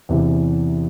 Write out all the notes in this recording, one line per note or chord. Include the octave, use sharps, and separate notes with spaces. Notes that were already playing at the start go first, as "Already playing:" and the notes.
E2 C3 E3